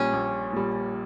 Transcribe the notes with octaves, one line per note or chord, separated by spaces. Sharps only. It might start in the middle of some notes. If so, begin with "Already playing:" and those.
Already playing: A#1 A#2 G3 C#4
A#1
A#2 G3